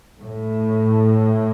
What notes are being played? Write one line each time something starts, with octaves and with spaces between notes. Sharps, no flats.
A2